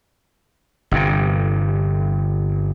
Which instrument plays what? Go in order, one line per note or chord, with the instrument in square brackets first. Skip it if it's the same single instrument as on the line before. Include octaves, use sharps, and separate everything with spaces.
[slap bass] G1 G2 C3